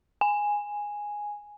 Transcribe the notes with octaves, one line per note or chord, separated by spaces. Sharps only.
G#5